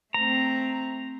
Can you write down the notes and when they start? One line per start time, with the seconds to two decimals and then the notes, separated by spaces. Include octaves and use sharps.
0.14 A3 C4 A#5